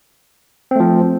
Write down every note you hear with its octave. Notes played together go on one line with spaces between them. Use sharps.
F3 A3 C4